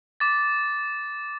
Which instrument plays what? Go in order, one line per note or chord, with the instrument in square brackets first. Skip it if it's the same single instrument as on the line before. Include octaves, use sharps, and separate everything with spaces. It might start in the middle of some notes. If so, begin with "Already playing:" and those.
[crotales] D6 A6